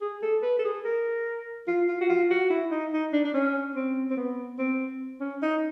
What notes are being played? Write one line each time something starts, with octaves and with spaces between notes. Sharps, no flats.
G#4
A4
B4
A4
G#4
A#4
F4
F4
F#4
F4
F#4
E4
D#4
D#4
D4
D4
C#4
C4
C4
B3
C4
C#4
D#4